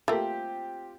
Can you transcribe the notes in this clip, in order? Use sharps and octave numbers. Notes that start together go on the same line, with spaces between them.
A3 A#3 C4 F4 G4